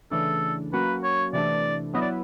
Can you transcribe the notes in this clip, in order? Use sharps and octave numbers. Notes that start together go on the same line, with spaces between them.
C#3 E3 A3 D4 A4
F#3 A#3 C#4 F#4 B4
C#5
C3 E3 A3 D4 D5
F#3 B3 E4 D#5
D5